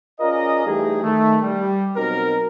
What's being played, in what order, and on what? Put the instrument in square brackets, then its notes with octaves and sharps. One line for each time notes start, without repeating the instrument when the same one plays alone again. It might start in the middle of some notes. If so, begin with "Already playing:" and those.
[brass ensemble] C#4 F4 G#4 A#4 D5 D#5
E3 G3 A3 D#4 G4 G#4
D#3 A3
G3
B2 F#3 C4 D#4 A#4